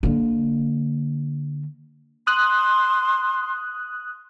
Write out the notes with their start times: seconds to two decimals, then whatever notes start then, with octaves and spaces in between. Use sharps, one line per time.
0.03 D3 A#3
2.27 C6 D#6 F#6